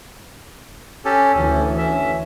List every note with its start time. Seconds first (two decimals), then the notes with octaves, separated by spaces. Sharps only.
1.05 C#4 G4 A4
1.35 D2 E3 C#4
1.78 C#4 E5